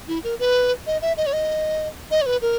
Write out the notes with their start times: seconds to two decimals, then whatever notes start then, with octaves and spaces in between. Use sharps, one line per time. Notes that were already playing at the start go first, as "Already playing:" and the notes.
0.08 E4
0.24 A#4
0.39 B4
0.87 D#5
1.02 E5
1.17 D#5
1.26 C#5
1.33 D#5
2.11 D#5
2.22 C#5
2.26 B4
2.42 A#4